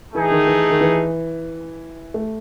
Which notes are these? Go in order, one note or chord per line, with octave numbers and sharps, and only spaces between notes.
E3 A3 D#4 G#4
D#3
E3
D#3
E3
A3